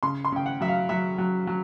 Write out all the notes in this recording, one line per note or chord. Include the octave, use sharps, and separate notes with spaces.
C#3 C6
C6
C#3 G5
F#5
F#3 E5
F5
F#3 E5
F#3
F#3